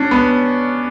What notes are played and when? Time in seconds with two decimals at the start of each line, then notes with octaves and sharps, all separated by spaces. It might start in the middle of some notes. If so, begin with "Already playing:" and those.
Already playing: C#4 D4
0.11 B3